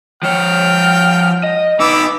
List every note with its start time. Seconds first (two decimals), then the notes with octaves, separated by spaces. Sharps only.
0.23 F3 C#5 G5 F6
1.44 D#5
1.80 B3 D#4 B4 D6 E6